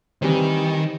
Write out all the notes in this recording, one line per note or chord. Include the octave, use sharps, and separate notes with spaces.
D#3 E3 G3 C4